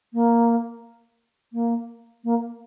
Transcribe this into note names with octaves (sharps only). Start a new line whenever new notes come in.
A#3
A#3
A#3